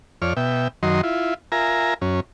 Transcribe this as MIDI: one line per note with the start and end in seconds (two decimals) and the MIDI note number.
0.22 0.33 41
0.22 0.33 73
0.22 0.33 74
0.22 0.33 89
0.37 0.68 47
0.37 0.68 76
0.37 0.68 79
0.83 1.01 42
0.83 1.01 51
0.83 1.01 54
0.83 1.01 75
0.83 1.01 84
1.03 1.34 64
1.03 1.34 65
1.52 1.94 65
1.52 1.94 70
1.52 1.94 76
1.52 1.94 80
1.52 1.94 82
2.02 2.20 42
2.02 2.20 61